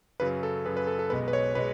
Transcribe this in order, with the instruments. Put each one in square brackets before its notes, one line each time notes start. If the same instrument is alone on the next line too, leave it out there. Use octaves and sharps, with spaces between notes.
[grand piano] F#2 C#3 F#3 [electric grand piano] B4
[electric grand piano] A4
[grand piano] F#2 C#3 F#3 [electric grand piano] B4
[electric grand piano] B4
A4
A4
[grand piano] B1 B2 G#3 B3 [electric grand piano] B4
[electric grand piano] B4
C#5
[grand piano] B2 G#3 [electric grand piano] B4